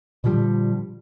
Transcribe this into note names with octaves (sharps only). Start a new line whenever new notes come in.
A#2 D3 F3 G3